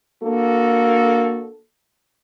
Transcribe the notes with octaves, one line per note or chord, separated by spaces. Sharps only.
A#3 D4 F#4 A4